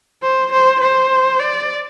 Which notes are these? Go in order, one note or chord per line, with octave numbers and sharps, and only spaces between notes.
C5
C5
C5
D5